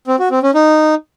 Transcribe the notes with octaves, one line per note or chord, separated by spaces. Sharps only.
C4
F#4
C4
C#4
D#4